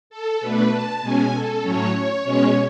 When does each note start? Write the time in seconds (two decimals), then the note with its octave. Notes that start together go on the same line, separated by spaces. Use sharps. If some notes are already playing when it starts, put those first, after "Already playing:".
0.10 A4
0.41 B2 A3 D4 B4
0.71 A5
1.02 B2 G#3 C#4 G#5
1.33 A4
1.62 A2 F#3 C#4 C#5
1.93 C#5
2.24 B2 G#3 C#4